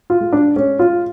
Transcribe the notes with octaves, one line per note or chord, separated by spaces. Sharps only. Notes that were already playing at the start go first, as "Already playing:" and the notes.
F4
G#3
D4
G#3 C#4
F4